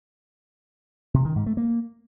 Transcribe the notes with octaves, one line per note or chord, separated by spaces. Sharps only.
C3
D#3
G#2
A3
A#3